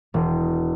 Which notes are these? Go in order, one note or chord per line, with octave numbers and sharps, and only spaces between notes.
E1